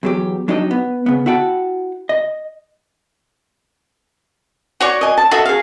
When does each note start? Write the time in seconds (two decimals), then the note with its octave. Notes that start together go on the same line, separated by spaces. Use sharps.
0.03 E2 F#3 G4
0.48 F#3 D4 D#4 G4 D#5
0.71 B3
1.06 C#3 B3
1.26 E4 F#4 F#5 G5 A5
2.09 D#5
4.81 F#4 C#5 D5 F#5 C#6
5.01 D#5 G#5
5.17 A5
5.31 F#4 A4 D#5 E5
5.45 G#4 F5